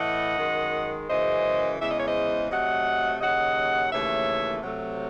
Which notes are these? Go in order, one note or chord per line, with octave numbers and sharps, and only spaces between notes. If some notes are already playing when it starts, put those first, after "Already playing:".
Already playing: A2 E3 A3 D#5 F#5
F#2 D#3 G#3
F#2 C#3 E3 G#3 C5 D#5
E2 C#3 E3 G#3 E5
D#5
C#5
C5 D#5
C3 F#3 A3 D#5 F#5
D#2 C#3 F#3 D#5 F#5
D#2 C#3 E3 A3 C#5 E5
C3 F#3 A3